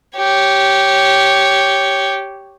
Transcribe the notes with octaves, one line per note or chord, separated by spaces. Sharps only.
G4 C#5